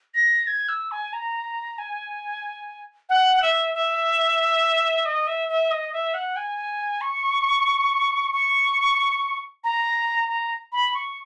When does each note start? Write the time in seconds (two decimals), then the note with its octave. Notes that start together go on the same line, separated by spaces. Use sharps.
0.14 A#6
0.47 G#6
0.69 E6
0.91 G#5
1.13 A#5
1.78 G#5
3.09 F#5
3.42 E5
3.74 E5
5.05 D#5
5.27 E5
5.49 E5
5.71 D#5
5.93 E5
6.14 F#5
6.36 G#5
7.01 C#6
8.33 C#6
9.64 A#5
10.28 A#5
10.72 B5
10.94 C#6